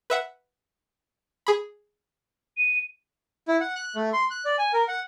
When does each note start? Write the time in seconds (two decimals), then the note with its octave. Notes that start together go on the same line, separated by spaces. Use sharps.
0.10 B4 E5 F#5
1.47 G#4 B5
2.57 D#7
3.48 E4
3.61 F#5
3.75 F#6
3.95 A3
4.13 C6
4.30 F#6
4.45 D5
4.58 G#5
4.73 A#4
4.88 F#5